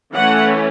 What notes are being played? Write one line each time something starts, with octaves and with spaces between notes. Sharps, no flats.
E3 A3 C#4 F#5